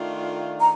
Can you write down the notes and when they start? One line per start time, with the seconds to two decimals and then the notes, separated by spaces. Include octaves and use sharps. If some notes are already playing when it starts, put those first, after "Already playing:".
Already playing: D#3 A3 D4 F4
0.60 A#5